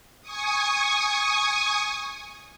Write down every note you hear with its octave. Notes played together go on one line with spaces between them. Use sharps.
G#5 C#6 D#6